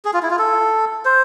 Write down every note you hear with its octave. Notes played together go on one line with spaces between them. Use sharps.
G#4
F4
E4
F4
A4
C5